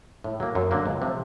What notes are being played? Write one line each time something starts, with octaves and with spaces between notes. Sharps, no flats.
A2
F#3 A#3
F#2
D3 F#3 A#3
C#2
C3 F3 A3